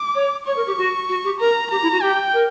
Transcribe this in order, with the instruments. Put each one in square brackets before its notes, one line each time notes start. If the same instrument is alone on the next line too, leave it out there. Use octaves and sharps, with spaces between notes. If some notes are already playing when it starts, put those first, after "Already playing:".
Already playing: [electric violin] D6
[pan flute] C#5
[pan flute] C#5 [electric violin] C#6
[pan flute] A#4
G4
F#4
F#4
G4
[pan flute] A#4 [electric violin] A#5
[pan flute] G4 [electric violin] A#5
[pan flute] E4
F#4
[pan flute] G4 [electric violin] G5
[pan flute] A#4